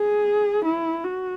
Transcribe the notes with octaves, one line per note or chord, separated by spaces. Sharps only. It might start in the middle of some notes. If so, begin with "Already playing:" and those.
Already playing: G#4
E4
F#4